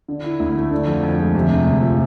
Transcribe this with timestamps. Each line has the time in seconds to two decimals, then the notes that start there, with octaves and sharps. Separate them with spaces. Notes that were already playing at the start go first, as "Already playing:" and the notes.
0.08 D3
0.24 E4
0.40 D2
0.56 A3
0.71 D3
0.87 F2
1.03 F2
1.18 G#3
1.35 C3
1.51 D2
1.66 D2
1.82 F3